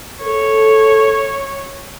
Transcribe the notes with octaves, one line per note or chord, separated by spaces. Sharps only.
A4 C#5